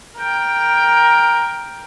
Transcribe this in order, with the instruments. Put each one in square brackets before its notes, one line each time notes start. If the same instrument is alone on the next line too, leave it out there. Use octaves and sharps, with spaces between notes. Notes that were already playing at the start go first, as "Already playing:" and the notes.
[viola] A#4 G5